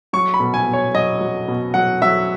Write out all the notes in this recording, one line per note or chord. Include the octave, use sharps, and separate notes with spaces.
F#3 C#6
B5
B2
G#5
B2
C#5
F#3 D#5
F#3
B2
F#3 F#5
F#3 E5